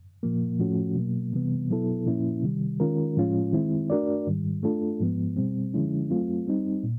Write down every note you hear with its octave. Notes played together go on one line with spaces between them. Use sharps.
A#2 F3 A#3
A2 F3 A3 C#4 F#4
B2 F#3 A#3
C3 E3 G3 B3
B2 F#3 B3 E4 A4
A#2 F3 A#3 C#4 E4
C3 D#3 G3
D#3 G#3 C#4 F4 A#4
A2 F3 G#3 C#4 F4
D#3 G#3 C4 E4
A3 D4 F#4 A#4 D5
G#2 D#3 G3
A3 D4 F4 A4
G#2 F3 G#3 B3
B2 G3 C4
D3 F3 G#3 C#4 E4
F#3 A3 C4 F4
G3 C4 D#4
A#2